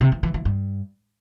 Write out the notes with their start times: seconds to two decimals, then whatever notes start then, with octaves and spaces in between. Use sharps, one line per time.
0.01 C3
0.12 E3
0.23 E3
0.34 E3
0.45 G2